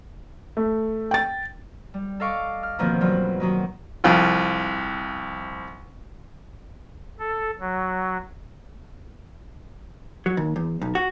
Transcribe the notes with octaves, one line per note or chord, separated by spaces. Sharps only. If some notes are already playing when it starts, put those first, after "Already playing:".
A3
G5 A6
G3
A4 D#5 F5 C#6 D6
F6
B2 D3 D#3 F3 A#3 C4
G2 E3 F#3 F4
D#3 F#3 D#4
C2 F2 F4
A4
F#3
F#3
D#2
E2
B1
F#4